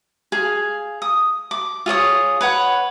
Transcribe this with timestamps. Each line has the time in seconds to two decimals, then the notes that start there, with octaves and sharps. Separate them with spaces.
0.32 G#4 F5
1.02 D#6
1.51 D6
1.86 F4 G#4 C#5 D#6
2.41 B4 C#5 F#5